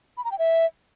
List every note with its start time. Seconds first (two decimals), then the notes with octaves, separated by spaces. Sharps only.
0.17 B5
0.24 A#5
0.32 G5
0.39 E5